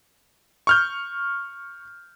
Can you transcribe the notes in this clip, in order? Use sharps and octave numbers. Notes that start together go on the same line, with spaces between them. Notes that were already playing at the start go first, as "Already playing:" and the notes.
C#6 F6 G6